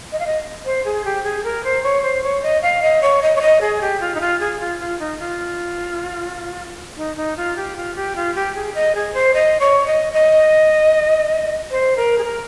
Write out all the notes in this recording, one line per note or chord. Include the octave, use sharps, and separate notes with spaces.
D#5
F5
D#5
C5
G#4
G4
G#4
A#4
C5
C#5
C5
C#5
D#5
F5
D#5
C#5
D#5
C#5
D#5
G#4
G4
F4
D#4
F4
G#4
F4
F4
D#4
F4
D#4
D#4
F4
G4
F4
G4
F4
G4
G#4
D#5
G#4
C5
D#5
C#5
D#5
D#5
C5
A#4
G#4
A#4